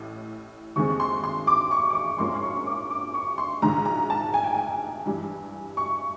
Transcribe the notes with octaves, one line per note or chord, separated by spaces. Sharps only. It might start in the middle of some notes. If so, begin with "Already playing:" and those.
Already playing: A1 A2
F1 D#2 D#3 G#3 C4 C#6
C6
C6
D6
C#6
D6
C#6
A#1 G#2 F3 A#3 C#4 C6
C6
C#6
D6
D6
C#6
C6
A#1 G#2 D#3 A#5
A#5
A5
G#5
G5
G#5
G2 E3 G3
C#6